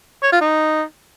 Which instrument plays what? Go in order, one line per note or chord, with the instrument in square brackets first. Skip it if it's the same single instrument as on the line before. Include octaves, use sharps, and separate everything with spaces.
[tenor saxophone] C#5
F4
D#4